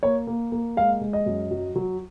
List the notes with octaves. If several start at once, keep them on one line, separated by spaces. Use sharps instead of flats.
A#3 C#5
A#3
A#3
G#3 F5
G#3
D#5
F#2
F#3
F#3